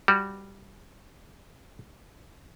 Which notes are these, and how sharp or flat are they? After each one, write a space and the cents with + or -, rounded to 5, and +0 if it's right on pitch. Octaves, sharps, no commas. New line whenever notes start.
G3 +0 F#4 +0